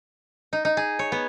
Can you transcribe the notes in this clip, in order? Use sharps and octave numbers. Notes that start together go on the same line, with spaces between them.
D#4
D#4
G#4
C#5
B3